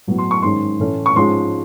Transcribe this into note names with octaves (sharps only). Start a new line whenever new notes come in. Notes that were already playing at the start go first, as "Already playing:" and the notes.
A2 F#3 B3
C6
C#6
G#2 D#3 G#3 C#4 C6
A2 E3 A3 C#4
C#6
G#2 F3 G#3 C#4 C6